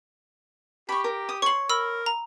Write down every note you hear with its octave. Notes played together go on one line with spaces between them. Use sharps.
G4 B5 C#6
A#4
D#6
C#5 C6 C#6 F#7
A#4 B5 E6
A#5